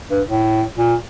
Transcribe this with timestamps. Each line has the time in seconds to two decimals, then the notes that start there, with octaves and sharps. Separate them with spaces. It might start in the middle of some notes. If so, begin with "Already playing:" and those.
0.10 G2
0.27 A2
0.77 A#2